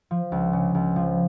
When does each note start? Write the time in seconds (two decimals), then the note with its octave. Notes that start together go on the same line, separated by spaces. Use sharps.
0.11 F3
0.32 C#2
0.53 C#3
0.75 C#2
0.96 F3